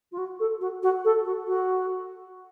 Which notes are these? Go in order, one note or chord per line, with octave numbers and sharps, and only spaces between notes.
F4
F#4
A4
F#4
F#4
A4
F#4
F#4